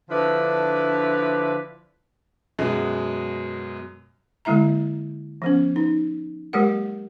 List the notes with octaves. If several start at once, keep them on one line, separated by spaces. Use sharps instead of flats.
D3 F3 D4 E4 B4
F#2 B2 G#3
D3 G#3 A#3 E4 E5 A#5
F3 B3 C#4
D#4
F#3 G#3 A#3 G4 A#4 F#5